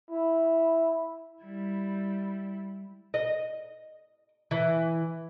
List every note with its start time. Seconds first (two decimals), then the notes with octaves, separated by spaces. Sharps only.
0.11 E4
1.43 G3 E4
3.14 D#5
4.51 E3